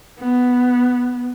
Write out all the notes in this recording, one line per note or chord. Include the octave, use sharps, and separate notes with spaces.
B3